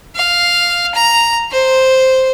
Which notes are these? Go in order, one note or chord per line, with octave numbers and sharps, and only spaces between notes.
F5
A#5
C5